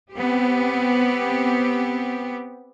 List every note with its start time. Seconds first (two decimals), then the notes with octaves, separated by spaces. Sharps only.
0.12 B3 C4 G4